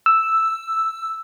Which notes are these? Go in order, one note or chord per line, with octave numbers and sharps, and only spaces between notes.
E6